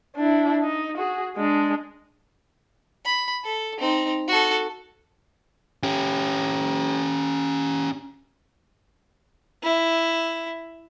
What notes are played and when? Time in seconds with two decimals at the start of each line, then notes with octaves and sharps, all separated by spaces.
0.16 D4 E4
0.63 D#4
0.98 F#4 G#4
1.37 G#3 D4
3.05 B5
3.44 A4
3.78 C4 D#4
4.28 F#4 A4
5.83 C#4 G4
9.63 E4